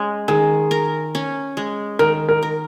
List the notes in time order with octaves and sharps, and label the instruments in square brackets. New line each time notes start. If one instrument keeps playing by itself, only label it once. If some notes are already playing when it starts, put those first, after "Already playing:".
Already playing: [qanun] G#3 C#4
[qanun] D#3 [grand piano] G#4
[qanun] A#4
C#4
G#3
[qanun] D#3 [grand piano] A#4
[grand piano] A#4
[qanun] A#4